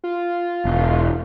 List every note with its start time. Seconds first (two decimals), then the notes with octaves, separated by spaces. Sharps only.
0.04 F4
0.65 E1